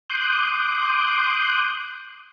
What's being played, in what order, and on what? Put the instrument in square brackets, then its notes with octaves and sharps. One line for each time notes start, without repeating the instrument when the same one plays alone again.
[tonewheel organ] C6 D6 D#6 F#6 G6